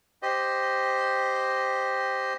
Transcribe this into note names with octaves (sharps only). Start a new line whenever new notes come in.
G4 C5 D#5